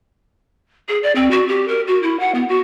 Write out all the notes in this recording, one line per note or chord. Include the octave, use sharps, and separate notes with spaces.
G#4
D5
C4
F#4
G4
A#4
F#4
E4
F#5
B3
F#4